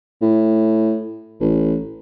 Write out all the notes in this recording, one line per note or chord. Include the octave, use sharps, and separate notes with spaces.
A2
A1